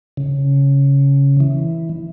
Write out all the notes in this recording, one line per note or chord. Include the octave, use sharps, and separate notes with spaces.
C#3
E3